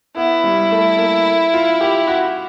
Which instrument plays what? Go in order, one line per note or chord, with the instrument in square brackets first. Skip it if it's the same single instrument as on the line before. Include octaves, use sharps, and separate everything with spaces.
[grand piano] B3 [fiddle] E4
[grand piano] G3
A3
A#3
F4
G4
F#4